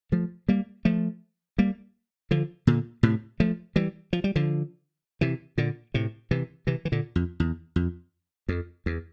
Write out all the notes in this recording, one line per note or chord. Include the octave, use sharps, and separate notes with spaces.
F3 A3
G3 A#3
F3 A3
G3 A#3
D3 F3
A#2 D3
A2 C3
F3 A3
E3 G3
F3
G3
D3 F3
C3 E3
A#2 D3
A2 C3
C3 E3
C3 E3
E3
A#2 D3
F2
E2
F2
F2
E2